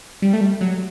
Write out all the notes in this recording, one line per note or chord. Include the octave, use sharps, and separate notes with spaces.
G3
A3
G3
F#3